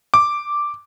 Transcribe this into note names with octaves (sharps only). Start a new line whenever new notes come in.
D6